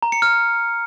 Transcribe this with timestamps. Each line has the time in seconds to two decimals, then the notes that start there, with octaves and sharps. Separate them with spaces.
0.03 A#5
0.12 C#7
0.22 F6